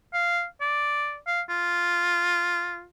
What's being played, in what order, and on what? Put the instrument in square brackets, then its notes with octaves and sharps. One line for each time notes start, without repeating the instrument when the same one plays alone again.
[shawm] F5
D5
F5
F4